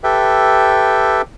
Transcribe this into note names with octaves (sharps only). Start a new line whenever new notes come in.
G4 A4 B4 E5 G5